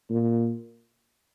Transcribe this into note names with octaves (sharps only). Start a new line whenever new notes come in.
A#2